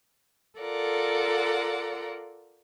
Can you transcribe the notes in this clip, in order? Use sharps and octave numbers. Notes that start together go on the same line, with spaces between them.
F4 A4 A#4 D5 F#5